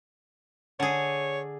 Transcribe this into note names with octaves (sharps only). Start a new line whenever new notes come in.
D3 G#4 C#5